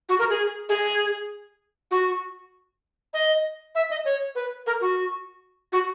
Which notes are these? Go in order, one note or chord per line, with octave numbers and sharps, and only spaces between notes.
F#4
A#4
G#4
G#4
F#4
D#5
E5
D#5
C#5
B4
A#4
F#4
F#4